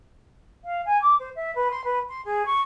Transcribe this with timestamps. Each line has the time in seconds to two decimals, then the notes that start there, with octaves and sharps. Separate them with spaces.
0.64 F5
0.85 G#5
1.01 D6
1.19 C5
1.35 E5
1.55 B4
1.70 C6
1.84 B4
2.08 C6
2.25 G#4
2.45 C#6